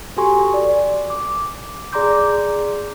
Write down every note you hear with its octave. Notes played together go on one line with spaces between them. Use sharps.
F#4 G4 A4 G#5 C6 C#6
D5
D6
G#4 D5 A#5 C6 D6 G6